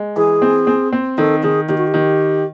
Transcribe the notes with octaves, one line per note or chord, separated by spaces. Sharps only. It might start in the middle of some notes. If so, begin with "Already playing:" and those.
Already playing: G#3
E3 G#4
C4
C4
C4
D#3 A4
D#3 G#4
D#3 G4
F#4
G4
D#3